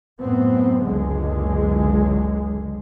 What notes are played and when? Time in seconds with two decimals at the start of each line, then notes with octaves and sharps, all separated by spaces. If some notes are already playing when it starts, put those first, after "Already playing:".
0.20 F#2 A2 B3 C4
0.85 F#1 C#2 D3 G#3